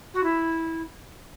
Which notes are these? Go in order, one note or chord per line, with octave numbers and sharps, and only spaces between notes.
F#4
E4